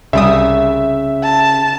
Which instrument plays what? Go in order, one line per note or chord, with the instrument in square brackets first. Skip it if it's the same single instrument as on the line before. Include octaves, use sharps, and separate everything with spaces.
[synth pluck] C2 G3 D#6 [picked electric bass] C#3 [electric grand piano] E5
[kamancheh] A5